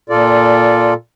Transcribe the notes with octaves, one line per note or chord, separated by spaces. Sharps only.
A#2 F4 A4 D5